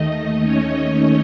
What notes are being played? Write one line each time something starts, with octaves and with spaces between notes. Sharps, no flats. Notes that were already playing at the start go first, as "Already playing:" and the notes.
Already playing: D#2 D#3 A3 D#4 D#5
C#4 C#5